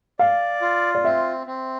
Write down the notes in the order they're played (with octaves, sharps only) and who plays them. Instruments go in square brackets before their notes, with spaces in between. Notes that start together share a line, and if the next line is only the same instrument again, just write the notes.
[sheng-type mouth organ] D5 [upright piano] F5
[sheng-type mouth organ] F4
[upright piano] D5
[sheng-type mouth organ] C4 [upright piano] E5
[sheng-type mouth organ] C4